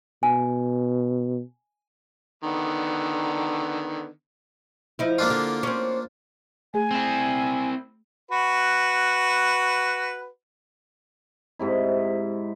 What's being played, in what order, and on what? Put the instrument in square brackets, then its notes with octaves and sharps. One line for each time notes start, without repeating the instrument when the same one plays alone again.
[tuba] B2 [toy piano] G#5
[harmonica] D3 D#3 B3
[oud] F3 D#4 E4
[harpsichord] A#3 D4 F4
[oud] D3
C4 C#4
[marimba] A3 G#4 [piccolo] G#5
[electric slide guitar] C4 E4
[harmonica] F#4 B4
[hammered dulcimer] G#2 C3 E4